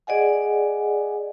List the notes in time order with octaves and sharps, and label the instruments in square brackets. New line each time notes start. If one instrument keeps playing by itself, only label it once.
[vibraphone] G#4 D5 D#5 F#5 G#5